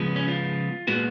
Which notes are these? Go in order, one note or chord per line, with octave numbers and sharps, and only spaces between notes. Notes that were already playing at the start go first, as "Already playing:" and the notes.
Already playing: C#3 F3 G#3 B3
C#4
F4
A#2 G#3 B3 F#4